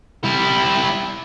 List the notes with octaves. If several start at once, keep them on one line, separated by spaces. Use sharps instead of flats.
G3 E4